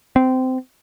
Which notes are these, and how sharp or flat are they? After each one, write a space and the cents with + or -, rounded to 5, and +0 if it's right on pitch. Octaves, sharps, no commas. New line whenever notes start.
C4 -20